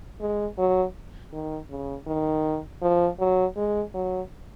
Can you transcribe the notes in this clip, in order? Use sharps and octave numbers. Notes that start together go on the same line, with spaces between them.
G#3
F#3
D#3
C#3
D#3
F3
F#3
G#3
F#3